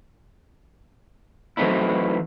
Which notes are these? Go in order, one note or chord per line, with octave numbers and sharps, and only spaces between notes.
E3 F#3 A3 C4 D#4 E4